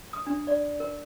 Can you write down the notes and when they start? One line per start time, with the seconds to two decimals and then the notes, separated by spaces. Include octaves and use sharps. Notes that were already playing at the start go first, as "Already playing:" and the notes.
0.13 D#6
0.27 D4
0.47 D5
0.80 A#4